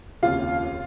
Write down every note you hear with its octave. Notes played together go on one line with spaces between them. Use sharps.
F1 D#2 C#3 F4 F5